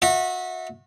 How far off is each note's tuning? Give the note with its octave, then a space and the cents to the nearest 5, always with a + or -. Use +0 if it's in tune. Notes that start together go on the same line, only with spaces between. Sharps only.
F#4 -30 E5 -25